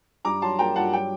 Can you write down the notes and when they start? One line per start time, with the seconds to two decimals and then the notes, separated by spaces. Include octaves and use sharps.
0.25 G2 A#5 D6
0.42 F#3 A5 C6
0.59 A#3 G5 A#5
0.76 G2 F#5 A5
0.93 F#3 G5